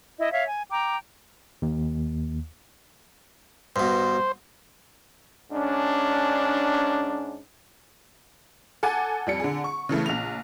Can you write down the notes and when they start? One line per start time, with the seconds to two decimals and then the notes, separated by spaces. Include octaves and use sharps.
0.19 E4 D#5
0.32 C#5 E5 F5
0.48 G#5
0.71 G5 A#5 D6
1.62 D#2
3.76 G2 B2 C5
5.51 G#2 C#4 D4
8.83 A4 F#5 G#5 D6
9.26 F2 G3 C#7
9.40 D3 G#4
9.64 C#6
9.89 C#3 E3 A3
10.06 A#1 F7